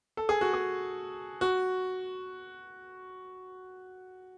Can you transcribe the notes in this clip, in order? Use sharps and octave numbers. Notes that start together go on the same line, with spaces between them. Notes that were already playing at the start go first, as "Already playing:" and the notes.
A4
G#4
F#4
G#4
F#4